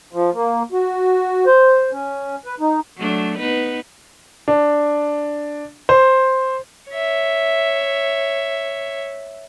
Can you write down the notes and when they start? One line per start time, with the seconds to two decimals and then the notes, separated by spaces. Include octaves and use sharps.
0.13 F3
0.33 A#3
0.72 F#4
1.47 C5
1.92 C#4
2.46 B4
2.60 D#4
2.97 F#3 A3 D4
3.39 B3 D#4 B4
4.48 D4
5.89 C5
6.91 C#5 E5